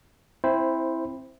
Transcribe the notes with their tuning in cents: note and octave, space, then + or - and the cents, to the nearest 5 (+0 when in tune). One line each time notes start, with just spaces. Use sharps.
C4 +15 E4 +0 C5 +0